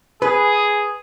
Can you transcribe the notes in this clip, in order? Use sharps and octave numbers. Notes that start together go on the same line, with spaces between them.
G#4 B4